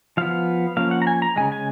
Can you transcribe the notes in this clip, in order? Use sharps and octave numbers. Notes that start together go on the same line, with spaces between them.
F3 B3 F5
F3 A#3 C#4 F5
F#5
A#5
G#5
A#5
C#3 F3 G#3 G#5
G#5